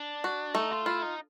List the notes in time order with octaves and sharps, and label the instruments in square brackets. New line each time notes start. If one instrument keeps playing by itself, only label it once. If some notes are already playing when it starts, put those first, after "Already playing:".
Already playing: [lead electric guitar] D4
[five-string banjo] F#4
[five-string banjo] A3 [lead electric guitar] D#4
[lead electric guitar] F4
[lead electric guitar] E4 [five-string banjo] F4
[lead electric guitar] D#4